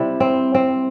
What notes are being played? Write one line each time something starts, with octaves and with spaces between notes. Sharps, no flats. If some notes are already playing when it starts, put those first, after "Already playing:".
Already playing: C3 G3 E4
C4
C4